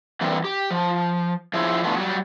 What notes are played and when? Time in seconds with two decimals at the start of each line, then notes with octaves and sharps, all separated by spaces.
0.21 D3 E3 G3 A#3 C4
0.44 G4
0.70 F3
1.54 F3 E4 G#4 C5 C#5
1.84 B2 D3 E3 A3 B3 F4
1.97 F#3 G3